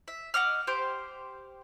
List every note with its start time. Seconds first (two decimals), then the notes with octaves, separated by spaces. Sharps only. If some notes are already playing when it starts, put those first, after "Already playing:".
0.08 E5
0.34 D#5 F#5 D6 F6
0.67 G4 C5 C6 D6